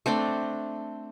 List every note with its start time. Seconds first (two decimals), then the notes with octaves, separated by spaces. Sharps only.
0.06 A3 C4 D4 G5